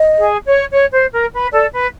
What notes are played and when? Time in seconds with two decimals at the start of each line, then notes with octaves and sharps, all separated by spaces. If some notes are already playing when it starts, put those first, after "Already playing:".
Already playing: D#5
0.19 G#4
0.45 C#5
0.72 C#5
0.93 C5
1.12 A#4
1.33 B4
1.52 A4 D5
1.73 B4